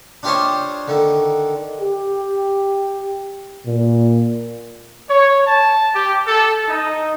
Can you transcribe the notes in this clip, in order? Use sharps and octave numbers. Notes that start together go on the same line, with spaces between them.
D4 F4 G4 C5 C#5 D#5
D3 D#3
G4
A#2
C#5
A5
G4
A4
D#4